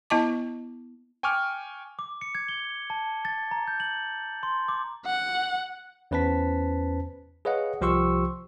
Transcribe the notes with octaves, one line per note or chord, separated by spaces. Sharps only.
B3 E4 D#5 A5 D6
G5 G#5 C#6 D6 F6
D6
C#7
G#6
G7
A5
A6
A#5
G6
F#7
C6
D6
F#5
E2 C#4 B4 C5 A5 B6
G#4 B4 C#5 D#5 F5 F#5
C2 F3 G4 C6 C#6 E6